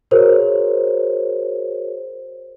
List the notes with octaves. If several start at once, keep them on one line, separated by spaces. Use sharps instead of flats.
F#4 G#4 A#4 C5 C#5